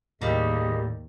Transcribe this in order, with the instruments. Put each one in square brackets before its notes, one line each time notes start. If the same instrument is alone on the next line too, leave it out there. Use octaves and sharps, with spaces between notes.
[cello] D#2 [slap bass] A2 [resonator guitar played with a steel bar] G3 A#3 [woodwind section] G#4 D#5